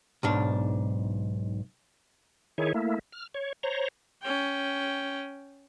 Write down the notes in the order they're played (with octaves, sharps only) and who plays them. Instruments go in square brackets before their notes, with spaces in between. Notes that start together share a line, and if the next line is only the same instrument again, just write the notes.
[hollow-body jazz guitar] B1 G#2 D4
[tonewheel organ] D#3 E4 G#4 C#5
A3 A#3 E4
F6
C#5
C5 C#5 A#5
[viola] C#4 G5